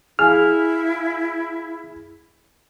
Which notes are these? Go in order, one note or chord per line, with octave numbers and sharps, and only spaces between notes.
E4 G#4 F5 G#5 F6